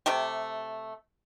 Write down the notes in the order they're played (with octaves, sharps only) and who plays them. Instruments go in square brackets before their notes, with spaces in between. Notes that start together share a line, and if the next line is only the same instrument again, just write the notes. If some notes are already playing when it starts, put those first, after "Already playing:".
[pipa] C3 A3 G4